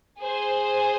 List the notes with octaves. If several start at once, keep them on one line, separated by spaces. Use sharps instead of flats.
G#4 C5